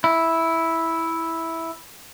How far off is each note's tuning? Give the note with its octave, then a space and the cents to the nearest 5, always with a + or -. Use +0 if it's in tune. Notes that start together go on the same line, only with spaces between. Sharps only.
E4 -5